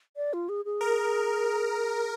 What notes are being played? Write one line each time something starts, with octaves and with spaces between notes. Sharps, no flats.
D5
F4
G#4
G#4
A#4